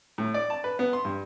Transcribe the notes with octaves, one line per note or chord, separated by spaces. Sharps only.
A2
D5
A5
B4
B3
C6
G2